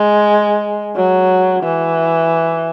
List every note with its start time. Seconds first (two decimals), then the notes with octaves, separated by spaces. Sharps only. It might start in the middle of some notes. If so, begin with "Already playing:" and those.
Already playing: G#3
0.96 F#3
1.63 E3